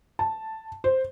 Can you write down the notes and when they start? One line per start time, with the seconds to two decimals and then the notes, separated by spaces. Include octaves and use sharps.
0.19 A5
0.84 C5